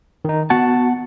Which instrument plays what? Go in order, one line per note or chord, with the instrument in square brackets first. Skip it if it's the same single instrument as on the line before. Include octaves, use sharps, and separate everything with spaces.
[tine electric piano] D#3 D#4
[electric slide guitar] B3 F#5 A5 [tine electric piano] F#4